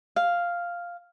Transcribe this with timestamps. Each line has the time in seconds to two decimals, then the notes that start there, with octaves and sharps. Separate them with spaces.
0.16 F5